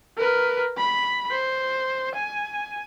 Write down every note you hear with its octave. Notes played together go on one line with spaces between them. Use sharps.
A#4 B4
B5
C5
G#5